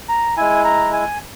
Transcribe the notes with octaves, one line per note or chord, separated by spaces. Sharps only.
A#5
G#3 E4 G#5
A#5
G#5